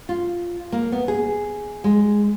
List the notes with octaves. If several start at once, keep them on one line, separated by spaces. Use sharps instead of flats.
F4
A#3
B3
G#4
G#3